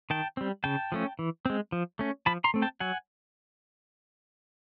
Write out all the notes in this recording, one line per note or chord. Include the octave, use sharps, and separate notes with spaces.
D#3 G5 A5
G3 C4
C#3 G5 A5
F3 A3 C#4
E3
G#3 C4
F3
A3 C#4
F3 A5 B5
A#5 C6
A3 C4
G5 A5
F#3 F#5 G#5